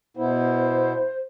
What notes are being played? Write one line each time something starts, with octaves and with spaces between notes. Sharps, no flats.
B2 B3 E4 C5